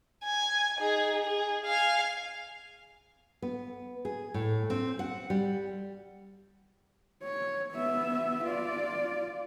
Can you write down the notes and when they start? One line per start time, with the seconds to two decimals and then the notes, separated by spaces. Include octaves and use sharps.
0.24 G#5
0.78 D#4 G#4
1.26 G#4
1.66 F5 G#5
3.42 B3
4.05 G#4
4.34 A2
4.70 C4
4.99 F#5
5.30 G3
7.23 C#5
7.72 B3 E5
8.45 F4 D5